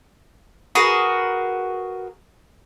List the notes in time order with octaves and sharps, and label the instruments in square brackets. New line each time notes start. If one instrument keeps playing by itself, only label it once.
[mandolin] F#4 G#4 A#4 B4